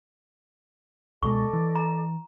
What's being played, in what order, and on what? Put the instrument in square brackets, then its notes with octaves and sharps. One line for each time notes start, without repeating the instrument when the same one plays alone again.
[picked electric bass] C#2 B2 G#3 [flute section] A4 D5 D#5 [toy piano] C#6
[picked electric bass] E3
[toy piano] A#5